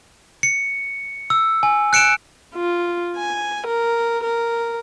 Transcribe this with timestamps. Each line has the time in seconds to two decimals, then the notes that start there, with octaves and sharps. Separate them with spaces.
0.43 C#7
1.30 E6
1.63 G#5
1.93 F#6 C#7 D7 E7
2.55 F4
3.16 G#5
3.67 A#4
4.24 A#4